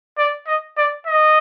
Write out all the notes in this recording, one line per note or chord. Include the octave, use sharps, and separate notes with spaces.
D5
D#5
D5
D#5